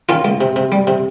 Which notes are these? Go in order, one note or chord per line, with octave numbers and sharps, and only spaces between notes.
D#3 C#4 F4
C#2
C3
C3
G3
C3